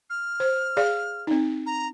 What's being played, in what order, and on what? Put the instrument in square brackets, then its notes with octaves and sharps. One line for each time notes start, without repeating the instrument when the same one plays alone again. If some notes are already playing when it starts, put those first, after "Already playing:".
[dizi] F6
[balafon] C5
G#4 D5 F5
C4 D#4
[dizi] A#5